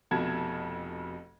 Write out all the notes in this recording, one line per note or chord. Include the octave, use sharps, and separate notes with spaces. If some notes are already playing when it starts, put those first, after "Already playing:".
F1 F2 B2 A5 G#6